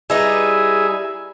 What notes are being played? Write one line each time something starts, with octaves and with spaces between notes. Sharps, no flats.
G3 D#4 E4 G#4 B4